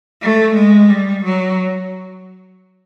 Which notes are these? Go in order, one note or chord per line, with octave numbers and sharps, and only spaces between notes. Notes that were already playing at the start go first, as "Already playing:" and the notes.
A3
G#3
G3
F#3